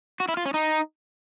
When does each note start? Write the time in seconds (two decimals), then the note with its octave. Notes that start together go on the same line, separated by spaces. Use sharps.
0.20 F#4
0.29 E4
0.37 F4
0.46 C#4
0.54 D#4